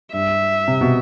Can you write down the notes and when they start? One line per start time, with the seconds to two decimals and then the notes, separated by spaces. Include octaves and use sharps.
0.13 G2 E5
0.68 C3
0.81 B2